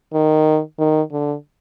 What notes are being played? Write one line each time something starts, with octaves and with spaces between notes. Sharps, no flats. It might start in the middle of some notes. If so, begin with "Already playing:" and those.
D#3
D#3
D3